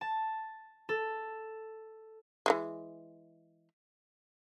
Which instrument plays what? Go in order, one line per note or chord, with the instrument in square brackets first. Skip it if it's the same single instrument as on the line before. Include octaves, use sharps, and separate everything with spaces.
[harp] A5
A4
[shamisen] E3 F#3 G#3